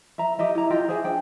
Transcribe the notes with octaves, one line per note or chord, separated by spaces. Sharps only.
E5 A#5
G4 D#5 E5
E4 A#5
F4 G4 D#5 G5
G#4 C5 E5 G#5
D4 G5